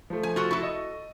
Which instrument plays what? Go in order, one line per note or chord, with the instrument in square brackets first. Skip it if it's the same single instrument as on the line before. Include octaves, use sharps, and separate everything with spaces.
[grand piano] F3 A3
[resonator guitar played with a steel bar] G#5
F4 F#4 A4
[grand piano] E4 [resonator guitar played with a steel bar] F#4 A4
[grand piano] D#5